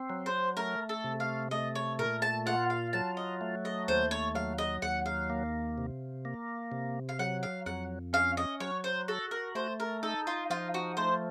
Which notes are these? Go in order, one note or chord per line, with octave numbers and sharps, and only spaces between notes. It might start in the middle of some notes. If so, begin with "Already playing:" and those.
Already playing: C4
F#3
C5
A3 A#4
A4
C3
F5
A3 D#5
C#5
A#2 A#4
A5
F4 F#5
F5
F#3 A5
D#5
A3
D#5
D#2 C5
C#5
F#3 F5
D#5
D#2 F#5
F5
A#3
C3
A#3
C3
F5
F#3 F#5
F5
F2 F#5
C#4 F5
D#5
F#3 C#5
C5
F#4 A4
A#4
A3 C5
A#4
D#4 A4
F4
F3 F4
F#4
A3 C5